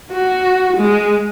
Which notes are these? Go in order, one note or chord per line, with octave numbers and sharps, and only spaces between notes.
F#4
G#3